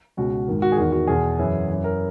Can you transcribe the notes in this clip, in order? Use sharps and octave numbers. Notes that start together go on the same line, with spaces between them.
C#2 B2 F#4
G#2 D#3
F#4
G#4
E2 D#3 F#4
F#4
E2 B2 G#4
F#2 E3
F#2 E3
A#4